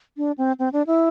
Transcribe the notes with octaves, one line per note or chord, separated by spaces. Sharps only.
D4
C4
C4
D4
E4